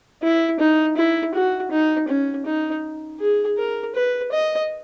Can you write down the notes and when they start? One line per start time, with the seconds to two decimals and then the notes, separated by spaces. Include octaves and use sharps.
0.23 E4
0.59 D#4
0.97 E4
1.34 F#4
1.71 D#4
2.08 C#4
2.46 D#4
3.20 G#4
3.58 A#4
3.95 B4
4.32 D#5